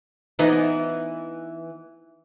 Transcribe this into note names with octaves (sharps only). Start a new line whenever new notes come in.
E3 B3 D#4